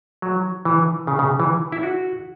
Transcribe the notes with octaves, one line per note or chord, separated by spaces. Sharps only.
F#3
E3
C#3
C#3
E3
E4
F#4